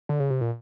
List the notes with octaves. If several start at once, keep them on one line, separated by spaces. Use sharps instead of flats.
D3
C#3
C3
A#2